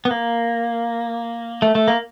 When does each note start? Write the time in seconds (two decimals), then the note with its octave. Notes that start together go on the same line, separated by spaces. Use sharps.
0.05 B3
0.11 A#3
1.62 A3
1.75 A3
1.88 A#3